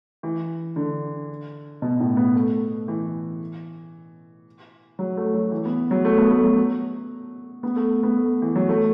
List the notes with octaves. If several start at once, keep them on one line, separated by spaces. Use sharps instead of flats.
E3
D3
B2
A2
B3
A3
E3
F#3
A3
F#3
E3
B3
F#3
A3
B3
A3
F#3
B3
A3
B3
A3
E3
F#3
A3